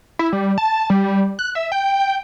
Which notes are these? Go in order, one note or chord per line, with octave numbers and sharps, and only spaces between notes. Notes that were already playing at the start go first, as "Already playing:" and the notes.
E4
G3
A5
G3
F#6
E5
G5
G5